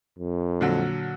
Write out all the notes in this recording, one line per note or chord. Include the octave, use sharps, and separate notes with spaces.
F2
A#2 D3 F#3